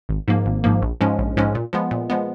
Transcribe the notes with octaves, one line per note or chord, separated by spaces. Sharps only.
G#1
G#2 F3 A#3
G#1
G#2 F3 A#3
A#1
G#2 F3 G#3 C#4
A#1
G#2 F3 G#3 C#4
A#2
F3 G#3 B3
A#2
F3 G#3 B3